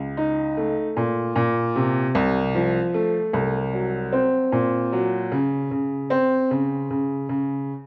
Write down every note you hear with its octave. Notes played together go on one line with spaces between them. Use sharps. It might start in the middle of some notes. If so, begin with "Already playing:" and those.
Already playing: C#2
D#4
A3
A#2
A#2
C3
C2
F3
A3
C2
F#3
C4
A#2
F#3
C#3
C#3
C4
C#3
C#3
C#3